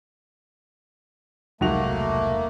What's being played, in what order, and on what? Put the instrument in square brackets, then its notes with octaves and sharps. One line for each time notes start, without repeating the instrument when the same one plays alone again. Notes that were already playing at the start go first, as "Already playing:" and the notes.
[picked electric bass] E1 C2 F#3 [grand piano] G#2 F#4 F7 [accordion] A3 A#3